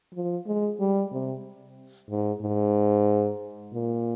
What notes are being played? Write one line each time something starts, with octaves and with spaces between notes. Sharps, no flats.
F3
G#3
G3
C3
G#2
G#2
A#2